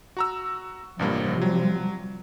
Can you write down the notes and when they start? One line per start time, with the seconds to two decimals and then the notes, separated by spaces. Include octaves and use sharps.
0.17 F#4 A#5 E6
0.99 A1 G2 C3 F3 G3 A#3
1.42 F#3